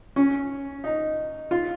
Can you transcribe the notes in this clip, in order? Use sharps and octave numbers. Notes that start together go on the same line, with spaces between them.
C#4
D#4
F4